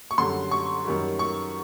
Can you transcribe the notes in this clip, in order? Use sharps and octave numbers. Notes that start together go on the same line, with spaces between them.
C#6
F#2 D3 G3 C6
C#6
F#2 D#3 G3
C#6